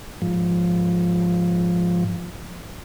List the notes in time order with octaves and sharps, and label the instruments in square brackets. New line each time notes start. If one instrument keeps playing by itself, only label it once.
[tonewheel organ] G#2 F3